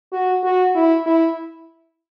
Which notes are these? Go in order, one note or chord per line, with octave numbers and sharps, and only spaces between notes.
F#4
F#4
E4
E4